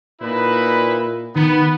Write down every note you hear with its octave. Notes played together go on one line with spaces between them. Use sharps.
A#2 D#4 E4 B4
D#3 B3